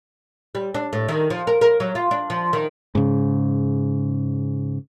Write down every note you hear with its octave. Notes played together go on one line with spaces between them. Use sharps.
G3
D4
A2
D#3
F3
A#4
A#4
F#3
F4
D4
F3
D#3
G#2 C#3